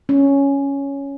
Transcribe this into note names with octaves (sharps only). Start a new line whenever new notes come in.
C#4